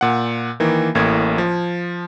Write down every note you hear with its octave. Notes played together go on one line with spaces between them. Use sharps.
A#2 F#5
D#3 E3 A#3
A1 A2 A#3 G#6
F3